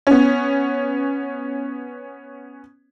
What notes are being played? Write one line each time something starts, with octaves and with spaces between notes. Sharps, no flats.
B3 C#4